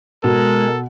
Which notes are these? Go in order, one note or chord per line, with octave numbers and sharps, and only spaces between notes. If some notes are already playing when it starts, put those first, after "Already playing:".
B2 G#3 A4 A#4